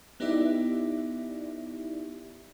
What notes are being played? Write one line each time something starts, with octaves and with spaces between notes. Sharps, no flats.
B3 D#4 E4 G4 D5 E5